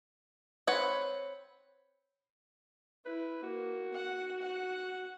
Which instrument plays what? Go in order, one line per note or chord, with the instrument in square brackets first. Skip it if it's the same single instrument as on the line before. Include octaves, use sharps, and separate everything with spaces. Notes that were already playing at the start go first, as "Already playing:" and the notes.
[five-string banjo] C4 B4 C#5 F#5
[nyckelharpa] E4 [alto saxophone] B4
[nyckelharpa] A#3 [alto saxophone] F#4
[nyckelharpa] F#5
F#5